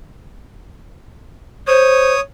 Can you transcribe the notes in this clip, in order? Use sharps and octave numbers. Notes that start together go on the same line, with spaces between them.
C5 C#5 D#6